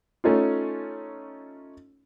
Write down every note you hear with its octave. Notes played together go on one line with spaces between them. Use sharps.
A3 C#4 D#4 F4